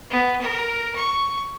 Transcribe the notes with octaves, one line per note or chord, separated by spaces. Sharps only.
B3
A#4
C#6